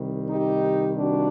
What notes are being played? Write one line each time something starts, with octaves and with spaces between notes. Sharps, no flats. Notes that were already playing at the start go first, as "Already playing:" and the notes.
Already playing: C2 C3 D#3 G3
D#4 G4
D4 F#4